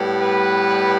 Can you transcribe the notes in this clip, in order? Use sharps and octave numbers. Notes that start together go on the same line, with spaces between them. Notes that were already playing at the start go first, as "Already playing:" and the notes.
Already playing: A2 G3 B3
B4